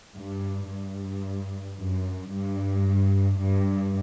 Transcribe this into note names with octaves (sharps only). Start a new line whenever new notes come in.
G2
G2
F#2
G2
G2